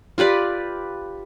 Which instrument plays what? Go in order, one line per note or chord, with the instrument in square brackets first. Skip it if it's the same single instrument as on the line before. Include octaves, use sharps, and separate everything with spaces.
[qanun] F4 G4 B4 D5